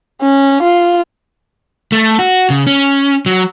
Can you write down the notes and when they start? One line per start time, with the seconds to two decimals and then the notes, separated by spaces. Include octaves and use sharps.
0.22 C#4
0.62 F4
1.92 A3
2.19 F#4
2.50 C#3
2.67 C#4
3.26 F#3